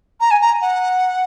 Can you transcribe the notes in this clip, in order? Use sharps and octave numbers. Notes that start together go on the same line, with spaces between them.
A#5
G#5
A#5
F#5